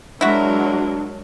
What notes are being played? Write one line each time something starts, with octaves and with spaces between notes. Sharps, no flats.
F#3 G#3 D4 E4 F#4 A#4